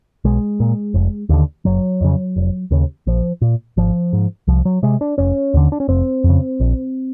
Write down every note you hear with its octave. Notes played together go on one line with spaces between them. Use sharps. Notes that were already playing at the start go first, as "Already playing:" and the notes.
B1 G#3
A#2
F1
D#2 D3
F#1 F#3
F2 C#3
F1
D#2 C#3
A#1 F3
A#2
G#1 F3
G#2
C2 F3
F#3
C3 G#3
D4
F1 C#4
D#2 D3
D4
C#4
F1 C4
F2
C#3
A#1